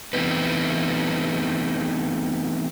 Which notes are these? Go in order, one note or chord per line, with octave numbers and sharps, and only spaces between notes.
E3 A3 B3 C4 D#4 B4